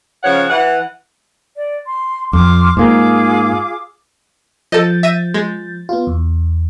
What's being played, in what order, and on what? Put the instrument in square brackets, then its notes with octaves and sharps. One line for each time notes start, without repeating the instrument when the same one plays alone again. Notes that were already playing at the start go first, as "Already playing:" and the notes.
[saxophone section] C#3 F3 C#5 F#5
E3 F#5
[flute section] D5
C6
[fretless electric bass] F2 [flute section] C6 D6 F6
[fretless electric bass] G#2 A#3 [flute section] F4 G#4 D6
[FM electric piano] F3 G6 A6 [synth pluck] A4 D#5
[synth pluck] E5 A#6 D#7
G#3
[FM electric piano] B3 F4
E2